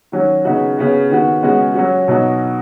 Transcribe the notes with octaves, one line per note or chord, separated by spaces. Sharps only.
D#3 F#3 C#4 F#4
C#3 B3 D#4 F#4
C#3 B3 F#4
D#3 B3 F#4
C#3 G#3 B3 F#4
F#3 C#4 F#4
B2 F#3 D#4 F#4